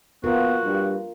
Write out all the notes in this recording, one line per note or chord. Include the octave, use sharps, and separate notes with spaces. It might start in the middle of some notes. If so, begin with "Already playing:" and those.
B3 F4 F#4 A#4
G2